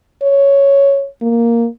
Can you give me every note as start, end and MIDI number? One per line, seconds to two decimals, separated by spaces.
0.22 1.07 73
1.22 1.68 58